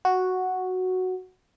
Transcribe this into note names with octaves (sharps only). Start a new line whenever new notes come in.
F#4